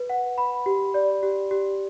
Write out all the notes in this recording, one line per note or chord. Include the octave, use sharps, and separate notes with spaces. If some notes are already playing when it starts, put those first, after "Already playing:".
Already playing: B4
F#5
B5
G4
D5
G4
G4